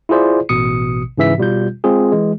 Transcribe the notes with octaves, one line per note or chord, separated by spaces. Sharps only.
E4 F4 G#4 C5 D5
A1 B2 D#6 C#7
G#2 C#3 E3 E5 B6
B2 G3 F4 G6
G#3 C4 F4 G#4
E3 G#3